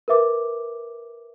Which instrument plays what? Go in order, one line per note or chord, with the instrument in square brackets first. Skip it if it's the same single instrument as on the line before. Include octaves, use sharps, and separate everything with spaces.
[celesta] A#4 B4 E5 D6